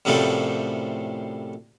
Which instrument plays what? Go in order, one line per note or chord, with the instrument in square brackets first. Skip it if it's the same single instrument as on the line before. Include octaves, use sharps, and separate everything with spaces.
[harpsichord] F#2 A2 C3 F3 G3 A3